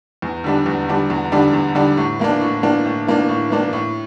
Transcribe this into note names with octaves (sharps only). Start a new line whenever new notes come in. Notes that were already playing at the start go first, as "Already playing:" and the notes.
E2
D3 G3 D4
E2
D3 G3 D4
E2
D3 G3 D4
E2
D3 G3 D4
A2
E3 A#3 D4
A2
E3 A#3 D4
A2
E3 A#3 D4
A2
E3 A#3 D4
A2